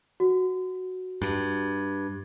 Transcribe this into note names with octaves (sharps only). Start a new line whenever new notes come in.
F#4
G2